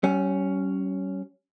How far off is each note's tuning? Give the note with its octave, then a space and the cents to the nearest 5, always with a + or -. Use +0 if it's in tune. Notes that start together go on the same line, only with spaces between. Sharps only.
G3 -40 C#4 +5